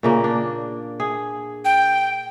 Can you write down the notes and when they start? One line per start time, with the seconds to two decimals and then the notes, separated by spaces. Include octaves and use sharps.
0.03 A#2 C#3 A#3
0.24 D4
1.00 G#4
1.65 G5